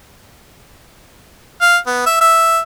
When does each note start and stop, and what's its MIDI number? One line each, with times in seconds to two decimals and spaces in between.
1.61 1.77 77
1.87 2.02 59
2.06 2.18 76
2.21 2.60 76